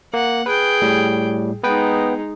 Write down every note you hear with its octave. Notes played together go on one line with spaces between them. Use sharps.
A#3 F#5
G#4 B4 G5
A2 G3
G#3 B3 D#4 B4 G5